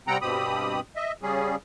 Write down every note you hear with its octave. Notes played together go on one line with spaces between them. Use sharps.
C3 G3 C4 F#5 G5 A#5
G2 B2 C4 G4 B5 D#6
D#5 E5
C#3 G3 C#4 G#4